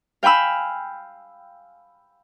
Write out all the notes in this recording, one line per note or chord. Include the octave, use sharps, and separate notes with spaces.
F5 G5 G#5 B5 E6